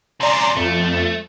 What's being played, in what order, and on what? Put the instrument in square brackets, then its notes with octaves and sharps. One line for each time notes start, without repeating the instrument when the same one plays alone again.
[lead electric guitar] C3 C#4 [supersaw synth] D5 A#5 C6
[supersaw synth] F2 [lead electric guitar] A3